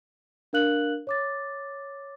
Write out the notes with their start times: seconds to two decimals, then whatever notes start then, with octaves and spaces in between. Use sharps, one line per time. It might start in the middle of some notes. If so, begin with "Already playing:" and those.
0.53 D4 A#4 F5 F#6 F#7
1.07 C#5 D6 A6